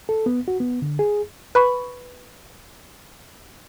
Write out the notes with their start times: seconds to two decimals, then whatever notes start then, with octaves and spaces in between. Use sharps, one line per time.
0.09 A4
0.26 B3
0.48 F#4
0.60 B3
0.82 D3
0.99 G#4
1.55 B4 B5 C#6